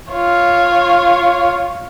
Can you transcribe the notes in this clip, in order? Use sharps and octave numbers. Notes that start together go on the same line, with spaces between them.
F4 C#5